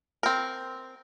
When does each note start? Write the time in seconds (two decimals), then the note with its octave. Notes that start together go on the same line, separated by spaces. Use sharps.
0.23 C4 A#4